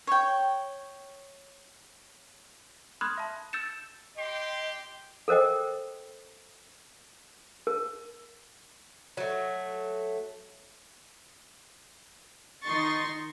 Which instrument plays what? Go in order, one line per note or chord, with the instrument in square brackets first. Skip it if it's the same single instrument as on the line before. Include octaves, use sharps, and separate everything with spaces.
[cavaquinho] C#5 G5
[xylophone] B5 C6 D#6 F6 F#6 G#6
E5 A5
E6 G6 A6 C#7 E7
[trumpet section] G4 G5 C6 [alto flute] D#5
[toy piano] A4 A#4 C5 D#5 G5
A#4
[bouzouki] F#3 A3
[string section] D#3 D#4 C6 C#6 A6